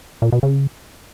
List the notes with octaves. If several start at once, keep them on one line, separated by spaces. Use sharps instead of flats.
A#2
B2
C#3